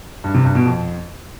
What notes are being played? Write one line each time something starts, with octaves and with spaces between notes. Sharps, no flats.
G2
C3
G2
B2
F2